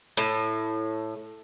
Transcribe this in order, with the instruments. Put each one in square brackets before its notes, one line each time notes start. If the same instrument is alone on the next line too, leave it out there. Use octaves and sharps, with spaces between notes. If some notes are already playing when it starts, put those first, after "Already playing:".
[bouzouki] A2